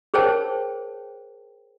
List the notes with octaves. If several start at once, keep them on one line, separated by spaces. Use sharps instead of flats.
G#4 A#4 C5 C#5 G5 A5